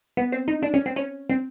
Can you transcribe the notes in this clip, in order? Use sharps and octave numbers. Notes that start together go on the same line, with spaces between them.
B3
C4
D#4
D4
C#4
C4
C#4
C4